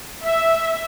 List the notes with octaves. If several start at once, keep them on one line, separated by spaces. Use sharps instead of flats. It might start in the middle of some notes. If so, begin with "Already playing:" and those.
E5